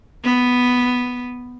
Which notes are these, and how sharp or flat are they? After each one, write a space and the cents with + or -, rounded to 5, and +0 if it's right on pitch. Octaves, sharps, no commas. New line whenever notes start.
B3 +0